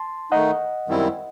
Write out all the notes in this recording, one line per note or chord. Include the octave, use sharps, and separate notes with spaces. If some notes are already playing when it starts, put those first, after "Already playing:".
Already playing: A5 C6
D#3 A3 D#4 D#5 F#5
F#2 D#3 G3 C4 E4